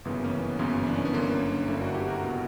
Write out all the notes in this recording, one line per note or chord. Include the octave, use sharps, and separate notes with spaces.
G1 F#2 C#3 E3 B3
A#3 C#4
B3
G1 F#2 C#3 E3 B3
D4
C#4
B3
G1 F#2 D3 A#3 C#4
G1 F#2 D3 C#4 E4
D4 F#4
E4 G4
F#4 A#4
C#2 B2